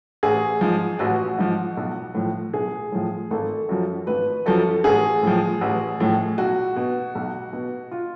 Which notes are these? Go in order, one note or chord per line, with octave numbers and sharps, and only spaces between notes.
A1 G#4
G#2 F3
A1 F#4
G#2 F3
B1
A2 F3
B1 G#4
A2 F3
G#1 A4
F#2 F3
G#1 B4
F#2 F3 A4
A1 G#4
A2 F3
A1
A2 F3
B1 F#4
B2
B1
B2
F4